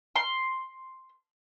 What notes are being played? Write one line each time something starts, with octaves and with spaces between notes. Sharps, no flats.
C6